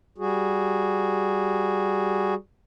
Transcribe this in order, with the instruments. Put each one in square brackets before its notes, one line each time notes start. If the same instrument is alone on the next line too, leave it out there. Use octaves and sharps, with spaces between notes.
[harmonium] G3 F#4 G#4